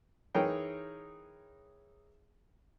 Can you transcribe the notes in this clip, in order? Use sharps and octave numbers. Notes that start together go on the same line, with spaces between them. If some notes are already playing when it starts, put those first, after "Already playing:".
E3 D#4 G#4 A#4 C#5 G5